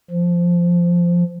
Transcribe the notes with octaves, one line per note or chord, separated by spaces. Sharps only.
F3